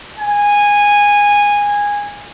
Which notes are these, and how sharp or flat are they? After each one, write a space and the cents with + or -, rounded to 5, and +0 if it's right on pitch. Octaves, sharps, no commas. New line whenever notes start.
G#5 -15